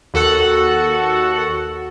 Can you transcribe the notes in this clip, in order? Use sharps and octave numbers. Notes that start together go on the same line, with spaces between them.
D#2 F#4 A4 F#5